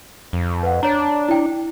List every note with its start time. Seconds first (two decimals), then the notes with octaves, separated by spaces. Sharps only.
0.33 F2
0.63 B4 F#5
0.83 D4 C#5 A#5
1.29 E4 G5